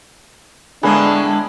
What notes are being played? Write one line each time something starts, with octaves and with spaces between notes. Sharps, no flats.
A2 D3 G#3 A#3 B3 D4 G#4